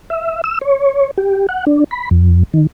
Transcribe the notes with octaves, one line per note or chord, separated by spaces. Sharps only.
E5
E6
C#5
G4
F#5
D4
B5
F2
D#3